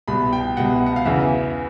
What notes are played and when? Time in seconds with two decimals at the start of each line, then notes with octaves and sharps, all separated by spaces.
0.08 C2 B2 B5
0.33 G5
0.57 C2 B2 F#5
0.86 F#5
0.96 F5
1.05 E2 C#3 E3 E5